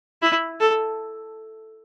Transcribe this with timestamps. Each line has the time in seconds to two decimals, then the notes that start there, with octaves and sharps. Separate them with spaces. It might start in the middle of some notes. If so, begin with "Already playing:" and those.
0.22 E4
0.60 A4